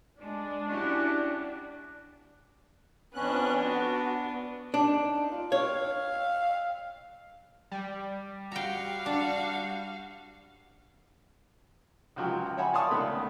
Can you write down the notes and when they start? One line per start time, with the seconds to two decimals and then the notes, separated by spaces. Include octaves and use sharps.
0.21 G#3 D4
0.69 C#4 E4 F#4 G4
3.14 F2 B3 C#4 D4 F#6
3.62 F#4
4.74 D4 D#4
5.32 F4
5.52 C#5 F5
7.72 G3
8.52 F#4 F5 G5 A#5
9.06 D4
12.16 C#2 F3 F#3 G5
12.57 C#5 E5 F#5 G#5 B5
12.74 D5 F5 A5 C6 C#6 D#6
12.91 C#2 D#3 A3 B3 B5